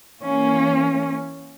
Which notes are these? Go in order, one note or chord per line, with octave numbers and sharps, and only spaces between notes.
E3 A#3 C#4